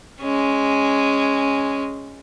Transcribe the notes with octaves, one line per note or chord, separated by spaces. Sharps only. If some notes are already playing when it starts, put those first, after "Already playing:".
G#3 C#4